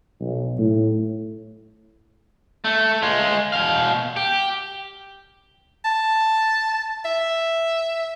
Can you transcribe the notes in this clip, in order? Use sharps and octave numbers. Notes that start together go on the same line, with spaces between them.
B1
A2
A3
G#3 F4
B2 F5
G4
A5
E5